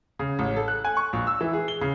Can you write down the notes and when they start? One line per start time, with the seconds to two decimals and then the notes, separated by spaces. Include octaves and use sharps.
0.19 C#3
0.39 A1
0.56 A4
0.68 F#6
0.85 G#5
0.97 C#6
1.13 A#1
1.27 E6
1.41 E3
1.53 G#4
1.68 G7
1.81 C#3